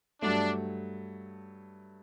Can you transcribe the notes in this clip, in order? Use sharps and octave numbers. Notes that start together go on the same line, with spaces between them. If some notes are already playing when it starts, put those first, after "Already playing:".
G2 F#3 A3 D4